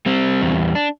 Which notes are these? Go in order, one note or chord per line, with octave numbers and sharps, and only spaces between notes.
G3 C4
E2
D4